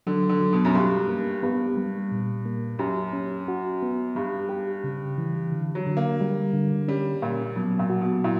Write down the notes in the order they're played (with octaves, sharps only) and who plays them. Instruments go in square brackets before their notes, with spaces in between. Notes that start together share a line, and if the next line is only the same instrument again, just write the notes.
[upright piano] D3 [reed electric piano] F#3
[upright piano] D3
[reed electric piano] F#3
[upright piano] B2
F#2
[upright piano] G2 [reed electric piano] G4
[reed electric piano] A#3
[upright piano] G2 [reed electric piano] B3
[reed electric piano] G3
A#2
A#3
[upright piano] F#2 [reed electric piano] G4
[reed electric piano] C#4
F#4
B3
[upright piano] G2 [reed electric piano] G3
[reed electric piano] G4
C#3
E3
D3
[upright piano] F#3
[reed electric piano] D3
[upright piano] A#3
[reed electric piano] G3
D3
[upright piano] G3 [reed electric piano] C#4
[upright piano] A#2 [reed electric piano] A#3
[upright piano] B2 [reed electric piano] F#3
[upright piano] A#2
[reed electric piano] F#4
[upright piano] B2
[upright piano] A#2 [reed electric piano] E4